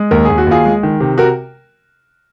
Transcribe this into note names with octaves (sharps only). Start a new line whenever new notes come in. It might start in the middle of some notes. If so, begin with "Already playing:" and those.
Already playing: G#3
D#2 A#4
D#2 G#4
F#4
D#2 F4 G#4
G#3
D#3
C3
F#4 A#4